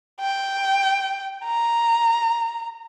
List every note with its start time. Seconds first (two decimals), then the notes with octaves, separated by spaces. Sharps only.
0.20 G5
1.45 A#5